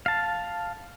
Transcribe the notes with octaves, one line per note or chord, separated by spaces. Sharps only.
F5 A5